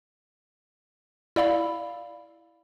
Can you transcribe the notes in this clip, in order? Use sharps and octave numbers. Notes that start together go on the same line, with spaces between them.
E4 D5 F5 B5